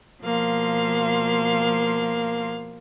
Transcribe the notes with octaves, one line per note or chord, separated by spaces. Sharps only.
B2 F3 A#3 F5 C6